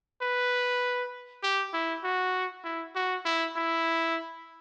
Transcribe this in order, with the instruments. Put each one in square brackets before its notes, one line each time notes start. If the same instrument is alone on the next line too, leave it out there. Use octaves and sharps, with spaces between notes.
[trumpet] B4
G4
E4
F#4
E4
F#4
E4
E4